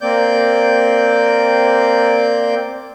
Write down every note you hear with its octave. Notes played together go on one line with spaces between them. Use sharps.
A#3 C4 D5 G6